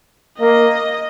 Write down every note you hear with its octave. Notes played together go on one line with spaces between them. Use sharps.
A#3 D#5